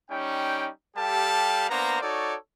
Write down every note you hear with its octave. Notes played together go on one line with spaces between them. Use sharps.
G3 C#4 D#4 G5
G3 G4 A4 F5 A5
A#3 B3 D4 C5 A#5
D#4 F#4 A4 C#5 D5